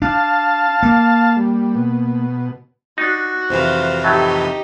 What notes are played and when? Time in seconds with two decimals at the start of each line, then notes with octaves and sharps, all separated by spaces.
0.02 D4 F5 A5
0.83 A#3
1.36 G3
1.75 B2
2.98 D4 D#4 F#4
3.49 F2 C3 E3 C5 F5
4.04 A2 F#3 A3 D#4 G4